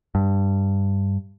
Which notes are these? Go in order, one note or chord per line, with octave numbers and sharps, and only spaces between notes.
G2